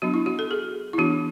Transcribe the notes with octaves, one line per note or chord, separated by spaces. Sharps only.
F#3 B3 D4 F#4
E4
F#4
A4
G#4
E4
E3 B3 D4 F#4